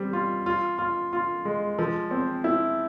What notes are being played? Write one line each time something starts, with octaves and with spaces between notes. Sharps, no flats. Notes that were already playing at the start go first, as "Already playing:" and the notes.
Already playing: G3 C4
F4
F4
F4
F4
G#3
F3
C4
E4